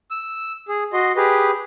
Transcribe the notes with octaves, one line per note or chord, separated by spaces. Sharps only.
E6
G#4
F#4 D#5 C6
G4 G#4 B4